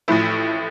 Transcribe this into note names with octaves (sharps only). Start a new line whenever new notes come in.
A1 A2 F3 A3 E4